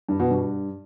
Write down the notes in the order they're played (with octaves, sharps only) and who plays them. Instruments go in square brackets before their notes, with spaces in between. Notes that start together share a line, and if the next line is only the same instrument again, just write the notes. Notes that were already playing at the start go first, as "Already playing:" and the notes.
[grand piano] G2
B2
G2